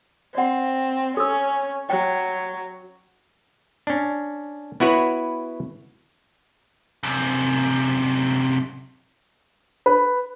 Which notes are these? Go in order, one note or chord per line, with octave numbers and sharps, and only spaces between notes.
C4 D5 F#5
C#4 A4 E6
F#3 G5
C#4 D4
B3 E4 F#4 B4 C#5
F#2 C3
B4